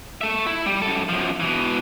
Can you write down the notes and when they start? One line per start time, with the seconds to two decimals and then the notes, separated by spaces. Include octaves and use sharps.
0.21 A3 E5
0.46 E4
0.66 G3
0.82 F#2 A4
1.09 F#2 F3
1.40 B2 E3